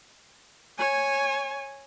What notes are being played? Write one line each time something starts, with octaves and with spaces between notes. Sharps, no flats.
C#5 G#5